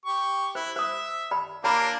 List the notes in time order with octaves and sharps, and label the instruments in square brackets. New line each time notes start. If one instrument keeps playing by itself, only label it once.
[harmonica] G4 C#6
[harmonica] E4 [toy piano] C5
[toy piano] C5 D#6 [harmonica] E5
[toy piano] D5 B5
[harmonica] A#3 D4 F4 [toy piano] C#5 A#5 B5